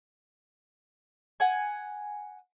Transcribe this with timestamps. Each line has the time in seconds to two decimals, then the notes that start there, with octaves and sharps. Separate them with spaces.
1.40 F#5 G#5